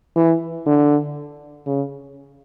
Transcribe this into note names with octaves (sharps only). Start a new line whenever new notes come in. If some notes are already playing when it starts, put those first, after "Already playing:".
E3
D3
C#3